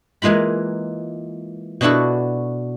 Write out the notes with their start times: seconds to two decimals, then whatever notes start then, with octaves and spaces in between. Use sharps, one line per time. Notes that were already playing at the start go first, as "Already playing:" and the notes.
0.22 E3 G#3 A#3 F4 B5
1.81 B2 B3 D4 E4 F#4 A4